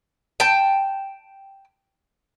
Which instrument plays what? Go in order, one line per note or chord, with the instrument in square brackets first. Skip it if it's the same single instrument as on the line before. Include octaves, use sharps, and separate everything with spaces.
[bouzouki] G5 A5